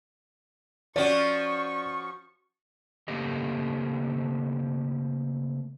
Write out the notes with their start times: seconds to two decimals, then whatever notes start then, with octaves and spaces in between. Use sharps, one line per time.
0.96 F3 C#4 F#4 D5 C#6
3.08 C#3 A3 A#3 C4 G4 D#5